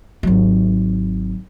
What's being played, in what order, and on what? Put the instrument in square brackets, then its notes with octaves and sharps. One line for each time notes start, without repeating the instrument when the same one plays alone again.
[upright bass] G#1 F#3